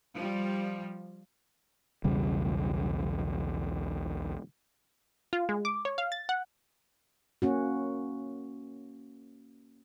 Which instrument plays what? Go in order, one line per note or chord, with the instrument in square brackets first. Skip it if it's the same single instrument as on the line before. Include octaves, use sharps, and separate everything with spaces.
[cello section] F3 G3
[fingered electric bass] B1 E2 C#3 G3
[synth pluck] F4
G#3
D6
C#5
F5
A6
F#5
[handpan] A#3 C#4 F#4